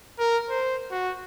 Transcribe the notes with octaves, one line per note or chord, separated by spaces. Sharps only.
A#4
C5
F#4